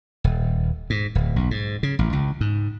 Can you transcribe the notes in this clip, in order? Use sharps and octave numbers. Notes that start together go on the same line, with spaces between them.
D#1
G#2
D1
B1
G#2
C#3
A1
C#2
G#2